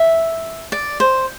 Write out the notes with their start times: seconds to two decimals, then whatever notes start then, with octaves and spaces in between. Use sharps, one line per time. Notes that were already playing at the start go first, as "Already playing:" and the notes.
Already playing: E5
0.72 D5
1.00 C5